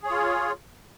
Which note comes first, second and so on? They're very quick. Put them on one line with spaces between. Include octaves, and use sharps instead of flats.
G#4 C#5 F4